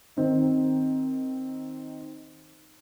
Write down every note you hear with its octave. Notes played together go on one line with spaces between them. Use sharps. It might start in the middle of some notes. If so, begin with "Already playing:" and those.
D#3 C4 D#4